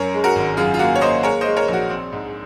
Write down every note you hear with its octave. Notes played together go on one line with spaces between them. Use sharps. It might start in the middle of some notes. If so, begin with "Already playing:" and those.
Already playing: F#2 A#4 C#5
G#3
F#4 A#4
G#1
F#2 F4 G#4
F4
A#3 F#4
C#5
A#3 C5 D#5
G#3 A#4 C#5
G#3 C5 D#5
A#4 C#5
A#1 F#4
C4
G#2